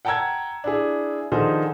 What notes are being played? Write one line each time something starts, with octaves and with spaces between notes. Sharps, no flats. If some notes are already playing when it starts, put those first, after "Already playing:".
F#5 G5 A5 A#5 E6 G#6
D4 E4 G#4
D3 D#3 F3 D#4 G#4 C5